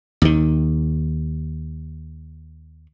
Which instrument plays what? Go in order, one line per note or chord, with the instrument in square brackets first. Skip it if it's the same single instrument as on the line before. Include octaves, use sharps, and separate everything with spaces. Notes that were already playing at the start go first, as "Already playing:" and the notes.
[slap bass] D#2 D#3